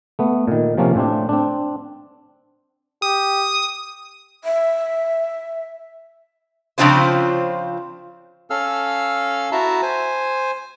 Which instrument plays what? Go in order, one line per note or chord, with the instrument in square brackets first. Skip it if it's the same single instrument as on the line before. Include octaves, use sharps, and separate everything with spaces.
[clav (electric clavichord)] A3 B3
A#2 D#3
C3 F3 A#3 C#4
A2 C4 D4
C4 D4
[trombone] G4 [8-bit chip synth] D#6
[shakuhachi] E5
[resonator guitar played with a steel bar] C#3 F3 C4 D4 F4 C5
[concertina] C#4 A4 F5 E6 F6
E4 F#4 E5 A5 A#5
C5 G#5